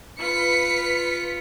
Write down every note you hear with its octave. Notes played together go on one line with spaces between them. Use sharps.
F4 B4 B6 C#7